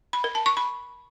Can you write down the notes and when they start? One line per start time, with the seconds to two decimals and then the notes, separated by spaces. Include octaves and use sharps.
0.13 B5
0.24 A#4
0.35 A5
0.46 C#6
0.57 B5